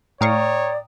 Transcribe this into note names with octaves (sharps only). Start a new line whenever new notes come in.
A2 C#5 D5 F5 G5 A#5 C#6 D#6